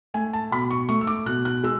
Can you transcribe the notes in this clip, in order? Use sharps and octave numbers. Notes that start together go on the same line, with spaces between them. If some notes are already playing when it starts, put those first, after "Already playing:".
A3 G#5
A5
B2 B5
C#6
A3 C#6
E6
D6
B2 F#6
F#6
G#3 E6